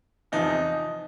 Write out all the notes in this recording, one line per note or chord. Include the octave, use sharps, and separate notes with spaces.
E2 C3 F3 D#4